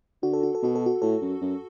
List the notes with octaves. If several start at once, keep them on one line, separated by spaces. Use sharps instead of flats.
D3 F#4
A4
F#4
A4
B2 F#4
A4
F#4
A2 A4
F#2
F#2